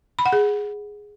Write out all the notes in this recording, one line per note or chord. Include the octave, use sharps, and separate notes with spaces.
B5
F#5
G#4